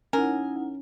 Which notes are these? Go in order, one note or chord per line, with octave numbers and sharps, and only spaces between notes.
C#4 D#4 E4 A#4 F#5 G#5